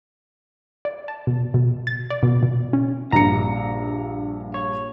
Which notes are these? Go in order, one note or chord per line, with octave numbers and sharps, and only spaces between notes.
D5
A5
B2
B2
A6
D5
B2
B2
C#4
A#1 G2 A#5 C#7
C#5